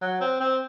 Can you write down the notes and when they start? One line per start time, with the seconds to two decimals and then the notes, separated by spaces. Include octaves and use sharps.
0.01 F#3
0.21 C4
0.40 C4